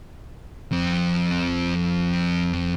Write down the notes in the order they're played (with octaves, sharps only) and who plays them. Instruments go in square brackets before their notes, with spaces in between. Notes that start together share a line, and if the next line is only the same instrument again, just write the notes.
[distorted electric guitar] F2 C4